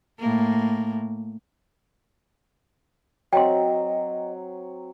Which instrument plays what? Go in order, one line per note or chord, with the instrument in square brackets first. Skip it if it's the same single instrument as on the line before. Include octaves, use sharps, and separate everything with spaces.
[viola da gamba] A2 A#3
[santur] F#3 C4 [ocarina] D#5 [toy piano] G5 C6